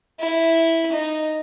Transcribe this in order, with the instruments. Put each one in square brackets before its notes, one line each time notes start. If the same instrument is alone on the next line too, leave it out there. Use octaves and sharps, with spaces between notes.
[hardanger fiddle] E4
D#4